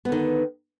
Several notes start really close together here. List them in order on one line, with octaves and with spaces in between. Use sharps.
B3 D3 D#3